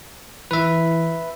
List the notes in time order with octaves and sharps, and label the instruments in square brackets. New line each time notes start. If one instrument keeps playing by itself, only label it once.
[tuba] E3 [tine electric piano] B4 E5